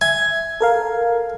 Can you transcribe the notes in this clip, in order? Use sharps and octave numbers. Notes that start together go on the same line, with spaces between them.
E5 G#5
A4 A#4 F5